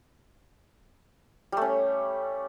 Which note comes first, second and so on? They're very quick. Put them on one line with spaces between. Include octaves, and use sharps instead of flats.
G3 A3 C#4